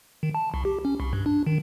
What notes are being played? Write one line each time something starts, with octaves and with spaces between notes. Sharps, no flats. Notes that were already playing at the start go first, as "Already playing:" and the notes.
D#3
A5
C2
G4
C#4
C2
G2
D4
D#3